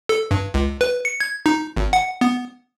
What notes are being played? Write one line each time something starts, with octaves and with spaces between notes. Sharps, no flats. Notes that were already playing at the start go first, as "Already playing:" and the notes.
A4
G2
C#2
B4
C#7
G#6
D#4
G#1
F#5
B3